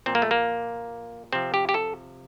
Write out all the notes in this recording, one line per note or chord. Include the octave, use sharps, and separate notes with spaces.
A#2 F3 C4
A#3
A3
A#3
C3 F3 C4
G4
G4
A4